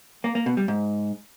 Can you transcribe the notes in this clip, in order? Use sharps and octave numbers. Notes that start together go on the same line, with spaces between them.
A#3
A#3
B2
G3
G#2